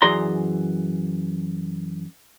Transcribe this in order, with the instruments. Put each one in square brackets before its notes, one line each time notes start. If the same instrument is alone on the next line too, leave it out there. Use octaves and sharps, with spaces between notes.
[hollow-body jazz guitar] F#2 E3 G#4 D5 A#5 C6